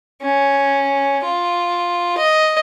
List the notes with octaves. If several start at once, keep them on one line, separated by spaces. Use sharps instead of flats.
C#4
F4
D#5